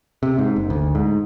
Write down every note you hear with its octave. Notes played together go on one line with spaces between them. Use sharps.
C3
G#2
F#1
D2
G#2